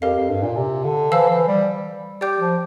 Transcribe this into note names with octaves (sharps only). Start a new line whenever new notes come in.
F2 G4 A#4 F5
F2
G2
A#2
C3
D3
E3 C5 F5 A5 E6
E3
G3
G4 D5 G5 D6 G6
F3